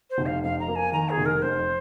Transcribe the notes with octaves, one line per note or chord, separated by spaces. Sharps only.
C5
F1
F5
F2 F5
A#5
A#3
G#5
D#3 A#5
G#4
F1
A#4
F2 C5